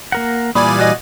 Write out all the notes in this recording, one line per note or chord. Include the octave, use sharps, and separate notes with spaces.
A#3 A#4 F#5
A#2 E3 G3 D5 G#5 B5 D#6
F#4 D#5